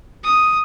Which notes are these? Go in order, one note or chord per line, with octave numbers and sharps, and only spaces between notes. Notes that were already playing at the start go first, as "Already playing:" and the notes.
D#6